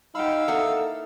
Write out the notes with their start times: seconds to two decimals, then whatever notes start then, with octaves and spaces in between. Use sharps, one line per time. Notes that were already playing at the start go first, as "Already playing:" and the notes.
0.15 D#4 G4 F5 F#5 B5 E6
0.48 A#3 D#4 E4 A4 F#5